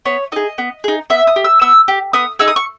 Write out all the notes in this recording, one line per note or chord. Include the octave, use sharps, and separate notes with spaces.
B3 C#5
D#4 G#4 D#5
B3
D#4 G#4
B3 E5
D#6
G4
E6
B3 E6
G4
B3 D#6
D#4 G#4 E6
D#6
C#6